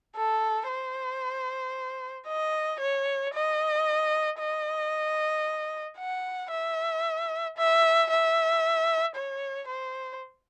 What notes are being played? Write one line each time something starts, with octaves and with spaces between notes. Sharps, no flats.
A4
C5
D#5
C#5
D#5
D#5
F#5
E5
E5
E5
C#5
C5